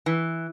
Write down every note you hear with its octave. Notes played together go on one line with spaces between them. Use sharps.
E3